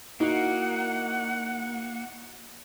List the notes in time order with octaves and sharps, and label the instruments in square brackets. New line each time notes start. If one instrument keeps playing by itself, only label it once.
[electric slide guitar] A#3 [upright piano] D#4 [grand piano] E4 F#4 [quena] F#5